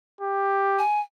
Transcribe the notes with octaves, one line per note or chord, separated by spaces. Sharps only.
G4
G#5